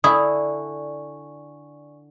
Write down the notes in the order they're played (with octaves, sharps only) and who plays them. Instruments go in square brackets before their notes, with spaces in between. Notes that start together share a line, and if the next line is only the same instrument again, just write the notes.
[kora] D3 [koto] E4 [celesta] D5 G#5 C#6 [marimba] D#6